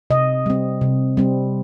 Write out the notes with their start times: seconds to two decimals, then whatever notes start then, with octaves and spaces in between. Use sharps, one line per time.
0.10 C3 D#5
0.46 G3 C4
0.81 C3
1.17 G3 C4